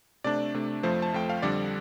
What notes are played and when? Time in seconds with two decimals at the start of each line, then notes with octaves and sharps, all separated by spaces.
0.24 C3 A3 D4 D5
0.54 C3 A3 D4
0.83 F2 F3 A3 C5
1.02 A5
1.13 F2 F3 A3 G5
1.29 F5
1.42 F2 D3 G3 D4 D5